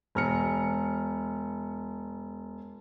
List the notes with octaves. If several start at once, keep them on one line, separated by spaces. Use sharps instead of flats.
E1 F6 C#7